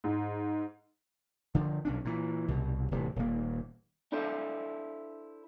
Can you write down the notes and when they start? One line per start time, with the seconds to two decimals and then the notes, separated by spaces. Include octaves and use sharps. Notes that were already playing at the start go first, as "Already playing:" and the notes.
0.04 G#2
1.55 D3 F3
1.85 B1 C#4 D4
2.05 A#2 E3
2.48 C2 B2
2.91 D1 C3 E3
3.16 D#1 A#3
4.12 D4 E4 A4 C5